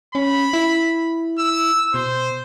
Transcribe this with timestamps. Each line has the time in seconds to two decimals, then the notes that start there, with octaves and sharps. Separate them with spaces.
0.15 C#4 B5
0.53 E4
1.39 E6
1.94 B2 C5